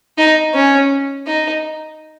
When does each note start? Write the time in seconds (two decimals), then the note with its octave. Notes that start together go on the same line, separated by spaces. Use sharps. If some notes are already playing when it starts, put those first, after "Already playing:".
0.18 D#4
0.54 C#4
1.27 D#4